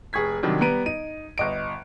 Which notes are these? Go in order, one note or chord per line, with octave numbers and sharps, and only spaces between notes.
F1 G#4 C#6 G#6 B6
C3 D#3 F#3 G3 D4
G3 B3 B4 A#5 D7 D#7
D#4 D#7
G1 D#5 D7